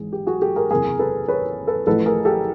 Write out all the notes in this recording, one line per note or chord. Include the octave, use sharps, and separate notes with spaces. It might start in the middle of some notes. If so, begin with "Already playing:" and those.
Already playing: G#1 G#2 E3 G#4
G4
F#4 G#4
G4 A4
G#4 A#4
F#1 E2 C3 G#4 A#4
A4 B4
B4 C#5
A4 B4
A1 A2 F3 A4 B4
G#4 A#4
G4 A4